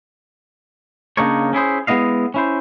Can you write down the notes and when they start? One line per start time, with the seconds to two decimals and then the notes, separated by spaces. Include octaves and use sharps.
1.17 C#3 A#3 D4 D#4 A#4 C#5
1.53 C#4 E4 G#4 C5
1.87 G#3 B3 E4 D#5 F5
2.34 C#4 E4 C5